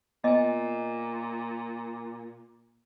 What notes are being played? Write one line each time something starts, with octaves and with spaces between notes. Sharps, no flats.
A#2 B3 D#5 G#5